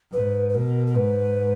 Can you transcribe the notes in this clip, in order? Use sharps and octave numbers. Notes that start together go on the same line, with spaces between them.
G#2 B4
B4
B2 A#4
A#4
G#2 B4